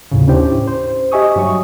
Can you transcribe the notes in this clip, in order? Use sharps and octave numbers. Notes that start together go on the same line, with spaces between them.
D#2 A2 C#3
C#4 D4 E4 G4 C5
C5
G4 D#5 E5 G#5 C#6 D#6
G2 F#3 G3 C#6